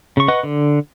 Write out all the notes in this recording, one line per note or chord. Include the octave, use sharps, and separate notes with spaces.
C#3 C#6
B4 D#5 F#5 C#6 F#6
D3